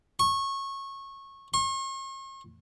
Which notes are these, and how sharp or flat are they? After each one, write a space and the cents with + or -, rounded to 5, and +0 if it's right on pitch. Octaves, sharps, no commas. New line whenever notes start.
C#6 -20
C#6 -45